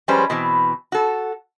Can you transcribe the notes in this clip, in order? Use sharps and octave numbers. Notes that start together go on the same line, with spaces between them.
F3 G3 G#3 C#4 B4 C5
B2 E3 C4
F#4 A4